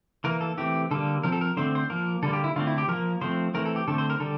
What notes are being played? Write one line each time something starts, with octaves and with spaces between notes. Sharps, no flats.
E3 A#3 A#4
A4
E3 A3 C4 G4
D3 G3 A#3 A4
F3 C4 A#4
A4
A#4
D3 A3 C4 C5
C5
F3 A#3 A#4
D3 G3 A#3 A4
G4
E4
D3 A3 C4 F4
E4
G4
F3 A#3 A#4
F3 A3 C4 C5
E3 A3 C4 A#4
A4
G4
D3 A3 C4 A4
C5
A#4
D3 G3 A4